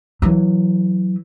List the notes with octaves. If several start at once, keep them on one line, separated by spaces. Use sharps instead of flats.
E3 F#3